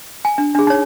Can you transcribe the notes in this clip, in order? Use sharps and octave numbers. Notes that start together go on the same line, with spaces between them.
G#5
D4
D4 G#4
D#4 C#5